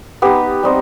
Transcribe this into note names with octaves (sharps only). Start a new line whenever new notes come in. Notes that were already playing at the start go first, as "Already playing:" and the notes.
B3 D#4 G4
G3 C4 D#4